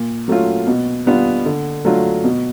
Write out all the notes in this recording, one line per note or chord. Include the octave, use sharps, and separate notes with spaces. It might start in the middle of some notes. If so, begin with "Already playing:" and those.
Already playing: A#2
F#3 A3 C#4 F4
B2
G3 B3 D4 F4
D3
F#3 A3 D4 F4
B2